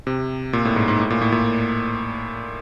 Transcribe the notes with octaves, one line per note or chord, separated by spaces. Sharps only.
C3
A#2
A2
G#2
G#2
A2
A#2
A2
A#2